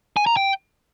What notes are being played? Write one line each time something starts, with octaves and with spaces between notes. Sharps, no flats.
G#5
A#5
G5